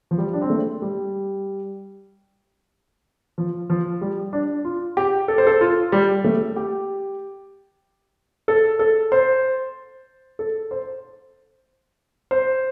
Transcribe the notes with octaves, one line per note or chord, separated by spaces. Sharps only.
F3
G3
D4
C4
A3
G3
F3
F3
G3
D4
F4
G4
A4
C5
A4
F4
G3
A3
G4
A4
A4
C5
A4
C5
C5